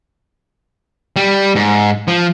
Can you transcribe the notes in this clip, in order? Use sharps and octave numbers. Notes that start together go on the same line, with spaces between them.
G3
G#2
F3